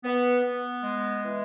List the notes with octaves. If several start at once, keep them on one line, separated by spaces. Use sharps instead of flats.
B3
B3
G#3
E3